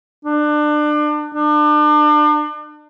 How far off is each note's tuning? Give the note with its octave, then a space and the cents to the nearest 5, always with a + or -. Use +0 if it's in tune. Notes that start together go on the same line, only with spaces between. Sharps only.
D4 +30
D4 +35